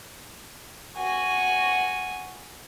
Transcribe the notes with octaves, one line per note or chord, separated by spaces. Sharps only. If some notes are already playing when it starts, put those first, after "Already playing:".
F#4 G#5